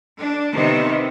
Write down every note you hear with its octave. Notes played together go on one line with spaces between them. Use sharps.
D4
C3 D#3 B3 C4 D#4